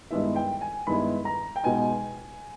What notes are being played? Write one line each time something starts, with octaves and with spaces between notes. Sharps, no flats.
G2 D#3 G#3 B3 E4 E5
G5
G#5
G2 D#3 G#3 B3 E4 B5
A#5
G5
B2 G#3 B3 D#4 G#5